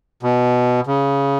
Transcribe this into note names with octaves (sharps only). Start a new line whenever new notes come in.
B2
C#3